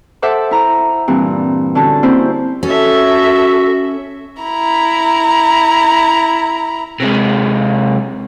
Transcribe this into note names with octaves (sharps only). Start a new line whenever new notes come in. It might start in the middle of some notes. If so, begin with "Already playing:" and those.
A4 C5 E5 F#5 D6
E4 A#5
G2 A#2 E3 C4
D3 C#4 F#4 A5
A#3 C4 C#4 E4 C5
C#4 F#4 A4 E5
E4 A#5
C3 G#3